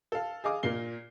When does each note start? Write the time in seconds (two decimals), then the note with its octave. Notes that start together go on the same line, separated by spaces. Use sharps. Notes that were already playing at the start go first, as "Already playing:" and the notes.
0.12 A4 F5
0.44 G#4 D#5 F5 D6 D#6
0.63 A#2 A#3 C7 G7